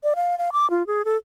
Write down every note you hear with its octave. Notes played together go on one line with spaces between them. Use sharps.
D5
F5
F5
D6
F4
G#4
A4